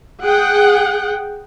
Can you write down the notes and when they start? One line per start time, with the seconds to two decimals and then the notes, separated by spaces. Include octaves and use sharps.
0.23 G#4 F#5 G5